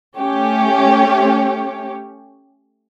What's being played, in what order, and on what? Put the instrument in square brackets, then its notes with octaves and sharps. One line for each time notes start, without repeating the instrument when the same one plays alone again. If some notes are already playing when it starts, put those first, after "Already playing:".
[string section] A3 C#4 G4 C#5